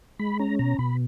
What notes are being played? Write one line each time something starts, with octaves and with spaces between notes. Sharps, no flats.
G#3 B5
C#4 A#5
B2 A#5
B2 B5